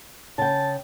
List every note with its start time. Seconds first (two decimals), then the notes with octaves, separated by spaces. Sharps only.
0.38 C#3 G5 A5